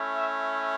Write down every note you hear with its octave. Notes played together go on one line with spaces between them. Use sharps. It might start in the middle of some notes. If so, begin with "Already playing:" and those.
Already playing: A3 C#4 E4
E5